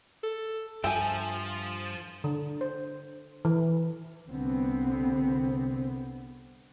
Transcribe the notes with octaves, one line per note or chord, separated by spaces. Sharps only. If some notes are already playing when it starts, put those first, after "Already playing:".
A4
G2 F3 A4 E5 G5 G#5
D3
C5
E3
C2 D3 B3 C4